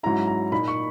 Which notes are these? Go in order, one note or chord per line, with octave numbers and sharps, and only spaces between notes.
G#2 F#3 C#4 E4 A#5
A#5
A#2 A#3 D#4 B5
C#6